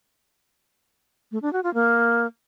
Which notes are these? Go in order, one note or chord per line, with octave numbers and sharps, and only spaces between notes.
A3
D4
F#4
F4
A#3